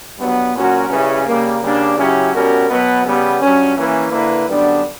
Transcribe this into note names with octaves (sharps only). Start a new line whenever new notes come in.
G2 F#3 B3
A#2 F#3 C#4 F#4 A#4
C#3 G3 C#4 E4 B4
C#3 G3 A#3
C#3 G3 A#3 D4
C#3 F#3 C#4 E4 G4
B2 G3 C#4 F#4 A#4
B2 F#3 B3
C#3 G3 B3
G2 F#3 C#4
E3 A#3 C#4 E4 B4
D3 A#3 E4 B4
F#2 D3 G3 B3 D4